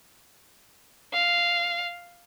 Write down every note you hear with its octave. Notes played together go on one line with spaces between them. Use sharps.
F5